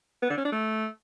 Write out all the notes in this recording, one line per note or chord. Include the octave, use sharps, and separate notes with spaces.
B3
D3
C#4
D4
A3